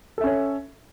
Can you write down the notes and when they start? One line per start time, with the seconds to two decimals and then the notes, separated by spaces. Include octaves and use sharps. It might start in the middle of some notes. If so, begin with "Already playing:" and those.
0.18 A4
0.21 E5
0.24 C#4
0.27 C#5